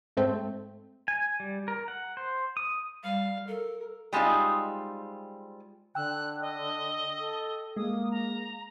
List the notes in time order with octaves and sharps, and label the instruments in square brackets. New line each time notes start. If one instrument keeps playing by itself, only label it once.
[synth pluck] G#2 A3 C4
[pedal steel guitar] G#5
G3
A#4
F#5
C5
D#6
[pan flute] G3 [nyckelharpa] F5
[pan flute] A4 [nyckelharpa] A#4
[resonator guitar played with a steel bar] G3 G#3 C4 D#4 F4
[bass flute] D3 [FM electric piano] G5 E6 [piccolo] F#6
[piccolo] D#5
[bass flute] A4
[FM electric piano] G#3 [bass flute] A#3 [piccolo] D#6
[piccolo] A#5